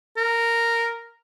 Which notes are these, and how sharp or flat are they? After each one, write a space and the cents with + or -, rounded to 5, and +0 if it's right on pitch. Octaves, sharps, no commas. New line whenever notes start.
A#4 -10